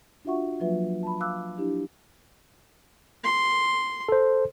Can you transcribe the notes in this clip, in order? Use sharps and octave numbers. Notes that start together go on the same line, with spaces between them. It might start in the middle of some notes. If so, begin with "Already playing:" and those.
D4 F4 F#4 E5 F#5 C#6
F3 F#3 A#3 F4 B4 E5
A5 B5
F5 D6 E6 F#6
D4 E4 G4
C6
A4 C5